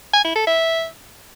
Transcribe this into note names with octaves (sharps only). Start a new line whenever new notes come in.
G#5
E4
A4
E5